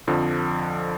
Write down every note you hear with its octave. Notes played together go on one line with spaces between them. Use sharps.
F2 D3 F3